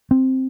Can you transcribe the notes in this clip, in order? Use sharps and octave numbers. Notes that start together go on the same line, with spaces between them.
C4